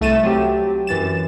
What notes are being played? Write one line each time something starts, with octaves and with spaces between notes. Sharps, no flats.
C2 A3 A6 D#7 E7
F#3 C4 G4
F#2 E3 A6 E7